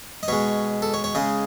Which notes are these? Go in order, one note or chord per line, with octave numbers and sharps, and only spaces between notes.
D#5
B2 G#3 C#5
A4
C#5
C#5
C#3 G#3 D#5